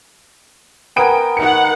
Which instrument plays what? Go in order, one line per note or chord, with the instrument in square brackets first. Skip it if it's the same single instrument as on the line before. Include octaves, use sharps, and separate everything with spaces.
[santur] B3 A#4 G#5 [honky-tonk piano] G5 D7
[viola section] D#3 F#5 [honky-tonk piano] C#7